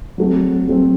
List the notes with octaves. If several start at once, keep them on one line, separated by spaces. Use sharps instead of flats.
F#3 A3 C4
F#3 A3 C4